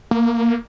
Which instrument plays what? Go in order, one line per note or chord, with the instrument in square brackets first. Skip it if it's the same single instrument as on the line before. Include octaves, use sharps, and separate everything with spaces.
[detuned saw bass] A#3